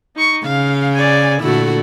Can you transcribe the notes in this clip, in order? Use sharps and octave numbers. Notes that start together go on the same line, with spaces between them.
D#4 C#6
C#3 F5
D5 G#5
A#2 D3 A3 E4 F#4